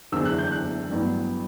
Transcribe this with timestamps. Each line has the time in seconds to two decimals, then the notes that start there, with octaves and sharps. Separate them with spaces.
0.12 F#1 E2 D3 E6
0.25 F#6
0.38 G6
0.51 F#6
0.90 A1 G2 F#3 B3